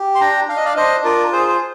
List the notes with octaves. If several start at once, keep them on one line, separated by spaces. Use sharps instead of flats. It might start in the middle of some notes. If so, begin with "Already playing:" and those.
Already playing: G4
C6
D4 G5 A#5
D4 F5
D#5
D5 F5
D4 C5 D#5
F4 A#4 D5
G#4 C5
C5